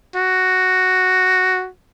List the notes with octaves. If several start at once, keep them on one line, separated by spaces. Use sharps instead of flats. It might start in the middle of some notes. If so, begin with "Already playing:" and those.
F#4